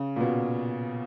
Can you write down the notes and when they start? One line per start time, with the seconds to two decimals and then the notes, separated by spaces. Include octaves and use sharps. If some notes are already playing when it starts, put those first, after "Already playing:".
Already playing: C#3
0.16 A#2
0.21 B2